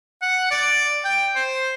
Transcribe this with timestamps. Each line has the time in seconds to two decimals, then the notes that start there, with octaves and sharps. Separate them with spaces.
0.22 F#5
0.51 D5
1.05 G5
1.36 C5